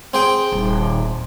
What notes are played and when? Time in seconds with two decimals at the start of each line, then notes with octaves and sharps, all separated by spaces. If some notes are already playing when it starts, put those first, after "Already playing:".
0.14 C4 G#4 G5
0.52 D#1